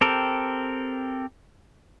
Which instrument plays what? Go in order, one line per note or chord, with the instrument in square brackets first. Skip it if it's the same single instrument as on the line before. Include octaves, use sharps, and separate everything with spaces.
[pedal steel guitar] C4 G4 A4 A#4